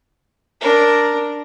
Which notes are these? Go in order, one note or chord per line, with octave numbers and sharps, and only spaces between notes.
D4 A#4